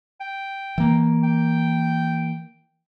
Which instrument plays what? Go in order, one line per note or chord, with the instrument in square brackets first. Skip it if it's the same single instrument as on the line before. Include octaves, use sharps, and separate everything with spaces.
[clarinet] G5
[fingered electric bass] E3 A#3
[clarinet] G5